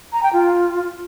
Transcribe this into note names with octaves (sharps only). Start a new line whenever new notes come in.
A#5
G5
F4